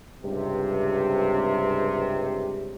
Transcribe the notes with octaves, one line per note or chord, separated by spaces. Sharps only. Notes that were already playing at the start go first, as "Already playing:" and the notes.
C#2 G2 C3